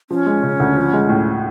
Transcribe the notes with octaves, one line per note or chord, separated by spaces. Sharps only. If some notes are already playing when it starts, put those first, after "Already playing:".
F3 C#4
G#3
C#3
D2
F3
G#3
A2